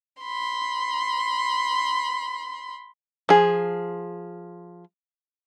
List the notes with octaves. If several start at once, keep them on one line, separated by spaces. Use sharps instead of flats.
B5 C6
F3 G#4